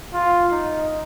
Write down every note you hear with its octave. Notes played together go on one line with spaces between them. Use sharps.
F4
D#4